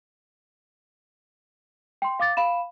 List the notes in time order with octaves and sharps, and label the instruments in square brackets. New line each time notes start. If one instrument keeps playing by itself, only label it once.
[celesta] G5 C6
F5 D6 A6
F5 B5 E7